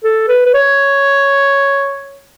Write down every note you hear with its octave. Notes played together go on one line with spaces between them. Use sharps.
A4
B4
B4
C#5